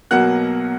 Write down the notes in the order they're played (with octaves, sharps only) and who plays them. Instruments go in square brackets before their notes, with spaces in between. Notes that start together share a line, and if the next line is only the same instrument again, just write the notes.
[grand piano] B1 B2 F#3 A#3 F#5 F#6